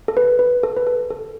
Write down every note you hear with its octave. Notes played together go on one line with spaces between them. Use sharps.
A4
B4
B4
A4
B4
A4
A4